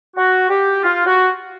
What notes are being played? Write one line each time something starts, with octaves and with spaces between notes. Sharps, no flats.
F#4
G4
F4
F#4